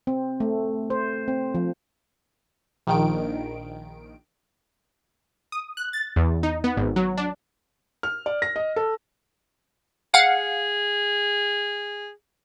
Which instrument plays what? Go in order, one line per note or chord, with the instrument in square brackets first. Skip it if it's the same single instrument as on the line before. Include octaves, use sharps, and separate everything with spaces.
[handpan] C4
A3
C5
C4
F3
[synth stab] A#1 D#3 D7
[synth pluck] D#6
F#6
A6
E2
D#4
B3
G#1
F#3
D4
[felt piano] F6
D5
A#6
D#5
A4
[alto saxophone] G#4 [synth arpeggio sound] F5 F#5